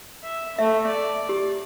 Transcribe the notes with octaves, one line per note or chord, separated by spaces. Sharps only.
E5
A3 E5
D5
G4